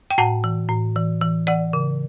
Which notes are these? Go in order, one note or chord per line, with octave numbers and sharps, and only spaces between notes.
G5
A2 F#5 A5
E3
A2
E3
E3
E3 D5 F#5
C#3